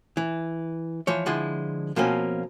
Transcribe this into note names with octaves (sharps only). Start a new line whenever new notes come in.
E3
E3 F3 C#5
D3 F3 G#3 E4
B2 F3 A#3 C4 C#4